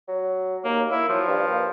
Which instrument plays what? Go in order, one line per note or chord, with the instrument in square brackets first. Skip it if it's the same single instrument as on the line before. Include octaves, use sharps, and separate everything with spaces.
[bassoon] F#3
[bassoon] D#2 [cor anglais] A#3
[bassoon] A#3 [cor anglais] E4
[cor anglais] F3 [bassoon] F#3
[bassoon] G2
A#3